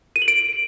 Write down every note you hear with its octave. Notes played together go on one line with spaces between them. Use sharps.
D#7
F#7
D7